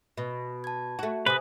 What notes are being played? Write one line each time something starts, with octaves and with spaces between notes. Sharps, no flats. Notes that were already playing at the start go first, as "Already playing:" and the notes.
B2
A5 G#6
A3 F#4
C3 B4 C5 G#5 D#6